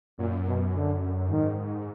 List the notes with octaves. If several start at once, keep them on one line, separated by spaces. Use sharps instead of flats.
F#2 A#2
B2
D3
G#2 D#3